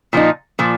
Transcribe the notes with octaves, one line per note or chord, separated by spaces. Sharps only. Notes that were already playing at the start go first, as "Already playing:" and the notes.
A#2 F3 D#4
A#2 F3